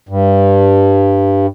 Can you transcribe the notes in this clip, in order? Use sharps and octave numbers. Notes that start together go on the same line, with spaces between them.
G2